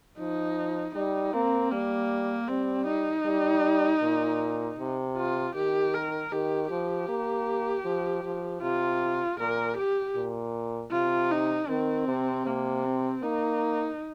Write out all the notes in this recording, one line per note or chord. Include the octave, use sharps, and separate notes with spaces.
F3 D#4
G3 D#4
A#3 C4
G3 A#3
G3 C4
D#4
G3
A#2
C3
F4
D#3 G4
A#4
D#3 G4
F3 G4
A#3
F3
F3
C3 F4
A#2 A#4
G4
A#2
C3 F4
D#4
D#3 C4
C3
C3 A#3
C4
A#3 D#4